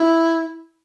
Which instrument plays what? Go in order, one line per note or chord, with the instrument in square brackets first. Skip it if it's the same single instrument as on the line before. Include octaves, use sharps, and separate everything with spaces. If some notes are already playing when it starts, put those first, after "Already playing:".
Already playing: [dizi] E4